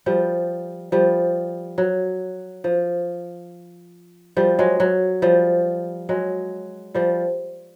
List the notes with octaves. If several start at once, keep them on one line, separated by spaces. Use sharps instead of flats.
F3 G3
F3 G3
F#3
F3
F3 G3
F#3 G#3
F#3
F3 G3
F#3 G#3
F3 G3